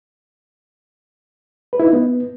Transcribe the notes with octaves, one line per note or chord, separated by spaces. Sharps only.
B4
E4
D#4
B3